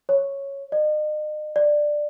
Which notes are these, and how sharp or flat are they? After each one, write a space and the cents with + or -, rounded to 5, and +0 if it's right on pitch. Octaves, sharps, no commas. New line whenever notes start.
C#5 -5
D#5 -40
D5 +10